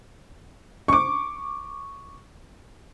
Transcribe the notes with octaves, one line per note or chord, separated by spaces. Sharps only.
C#6 D6